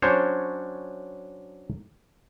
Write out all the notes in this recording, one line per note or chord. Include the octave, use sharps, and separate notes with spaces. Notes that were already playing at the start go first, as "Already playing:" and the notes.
F#3 C#4 D4 C5 C#5